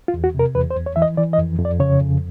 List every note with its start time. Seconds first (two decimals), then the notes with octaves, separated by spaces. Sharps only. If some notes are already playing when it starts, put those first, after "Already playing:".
0.08 F4
0.14 E2
0.24 F#4
0.34 C3 A#4
0.55 E2 B4
0.70 C5
0.76 E2
0.86 C#5
0.96 E3 E5
1.02 D#5
1.17 E3 D5
1.33 D#5
1.38 F2
1.59 F2
1.65 D5
1.80 C#3 C#5
2.01 F2